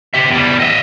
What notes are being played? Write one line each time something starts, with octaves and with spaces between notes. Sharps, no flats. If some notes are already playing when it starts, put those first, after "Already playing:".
G4 E5
E2 G3
D#5 E5